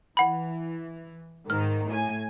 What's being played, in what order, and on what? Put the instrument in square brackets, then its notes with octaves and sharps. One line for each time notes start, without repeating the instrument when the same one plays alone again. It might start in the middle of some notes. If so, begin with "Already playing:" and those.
[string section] E3 [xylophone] F#5 B5
[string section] G#2 D#3 [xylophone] F6
[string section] A2 G#5